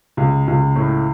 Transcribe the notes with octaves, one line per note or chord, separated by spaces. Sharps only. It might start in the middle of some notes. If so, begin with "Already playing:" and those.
C#2
C#2
A2